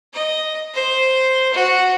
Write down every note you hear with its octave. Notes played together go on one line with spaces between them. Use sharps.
D#5
C5
F#4